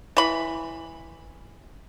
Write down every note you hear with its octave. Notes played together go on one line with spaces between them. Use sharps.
E3 B5